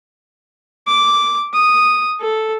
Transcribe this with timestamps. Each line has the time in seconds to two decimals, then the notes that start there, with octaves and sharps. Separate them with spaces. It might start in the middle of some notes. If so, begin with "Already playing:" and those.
0.87 D6
1.54 D#6
2.20 A4